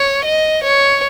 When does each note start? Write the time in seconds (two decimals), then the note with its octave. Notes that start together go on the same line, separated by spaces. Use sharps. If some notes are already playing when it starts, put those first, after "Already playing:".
Already playing: C#5
0.25 D#5
0.64 C#5